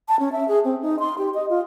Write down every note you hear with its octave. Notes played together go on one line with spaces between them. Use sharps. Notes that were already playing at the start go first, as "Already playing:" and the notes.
A5
C#4
E5
G#4
C4
D#4
C6
G4
D#5
F4